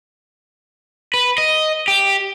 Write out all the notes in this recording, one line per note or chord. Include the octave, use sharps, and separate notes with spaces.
B4
D#5
G4